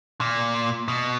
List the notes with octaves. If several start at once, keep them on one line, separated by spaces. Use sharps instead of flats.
A#2
B2